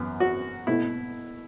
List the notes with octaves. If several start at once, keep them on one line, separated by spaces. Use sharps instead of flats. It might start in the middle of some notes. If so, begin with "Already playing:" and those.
Already playing: F#2 E3 B3
F#4
B2 A3 E4